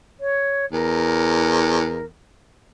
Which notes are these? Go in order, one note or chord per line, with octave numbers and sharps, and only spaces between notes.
C#5
E2 A#4